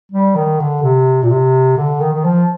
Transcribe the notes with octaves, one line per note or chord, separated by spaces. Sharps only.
G3
D#3
D3
C3
A#2
C3
D3
D#3
D#3
F3